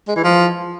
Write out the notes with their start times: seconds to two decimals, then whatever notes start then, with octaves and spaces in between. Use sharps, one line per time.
0.08 G#3
0.16 E3
0.24 F3